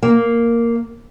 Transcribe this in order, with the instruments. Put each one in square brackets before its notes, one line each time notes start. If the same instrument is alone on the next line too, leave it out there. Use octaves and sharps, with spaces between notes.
[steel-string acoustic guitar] A#3